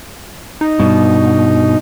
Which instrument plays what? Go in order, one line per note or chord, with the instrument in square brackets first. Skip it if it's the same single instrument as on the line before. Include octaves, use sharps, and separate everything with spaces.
[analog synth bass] D#4
[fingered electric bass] G2 [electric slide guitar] B2